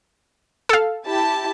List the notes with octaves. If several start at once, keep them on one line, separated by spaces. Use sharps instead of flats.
A4 F5
E4 G4 A5